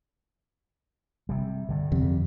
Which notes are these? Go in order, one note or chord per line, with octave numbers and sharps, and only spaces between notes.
C3 G3
G2 D3
F2 C3